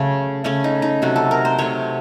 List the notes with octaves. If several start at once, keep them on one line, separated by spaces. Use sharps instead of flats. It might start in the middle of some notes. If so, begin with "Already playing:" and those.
Already playing: C#3 F#3 A3
C#3 A3 C#4
D#4
D#4
C3 F#3 A3 F#4
A4
A#4
C5
C3 F#3 A3 C#5